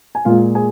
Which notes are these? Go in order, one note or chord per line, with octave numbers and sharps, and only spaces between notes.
G#5
A#2 G#3 F4 F5
G#4 G#5